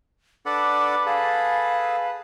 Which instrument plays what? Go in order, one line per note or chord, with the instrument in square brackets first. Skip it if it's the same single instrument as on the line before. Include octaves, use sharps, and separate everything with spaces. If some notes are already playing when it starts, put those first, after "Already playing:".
[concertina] D4 A4 F#5 [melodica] B4 A5 B5 [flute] D6
[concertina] G#4 A4 [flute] F5